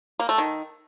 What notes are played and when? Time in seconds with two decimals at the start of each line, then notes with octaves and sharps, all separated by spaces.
0.20 A#3
0.29 A3
0.38 D#3